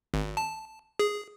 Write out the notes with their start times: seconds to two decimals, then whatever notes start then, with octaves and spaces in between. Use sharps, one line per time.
0.14 G#1
0.37 A5
0.99 G#4